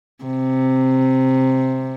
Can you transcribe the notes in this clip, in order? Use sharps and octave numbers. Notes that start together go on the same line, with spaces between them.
C3